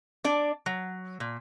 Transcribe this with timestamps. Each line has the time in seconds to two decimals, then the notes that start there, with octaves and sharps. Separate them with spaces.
0.24 D4 D5
0.66 F#3
1.20 A#2